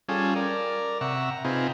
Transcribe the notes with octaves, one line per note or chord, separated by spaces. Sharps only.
G3 C#4 F4 G#4 A4
A#4 D5
C3 E5 F#5 A#5 C#6
A#5
C3 C4 D#4 F4 G#4 B4